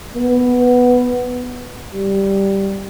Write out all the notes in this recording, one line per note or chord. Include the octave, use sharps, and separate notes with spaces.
B3
G3